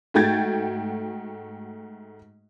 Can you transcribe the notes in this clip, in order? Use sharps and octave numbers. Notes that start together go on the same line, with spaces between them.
G#2 A3 F#4 G5 G#6 A6